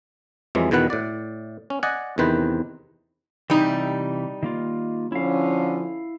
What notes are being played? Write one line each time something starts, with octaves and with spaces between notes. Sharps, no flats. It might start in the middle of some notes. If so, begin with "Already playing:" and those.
F2 E3 F#3 G#3
E2 B2 D#3 B4 F#5
A2 D5
C#4
D5 D#5 F#5 G#5
E2 C3 D#3 B4 C5
C3 E3 G3 D#4
D#3 A#3 F4
D3 F3 C#4 E4 F5